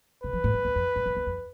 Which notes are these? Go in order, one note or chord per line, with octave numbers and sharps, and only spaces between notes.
C3 B4
F3
A2
F2
E2
F2
G2
F2
E2
F2